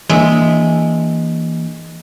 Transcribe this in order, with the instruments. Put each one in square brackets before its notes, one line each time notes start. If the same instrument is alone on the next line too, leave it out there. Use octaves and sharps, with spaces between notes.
[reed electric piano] E3 A#3 D4 [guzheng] G#3 E5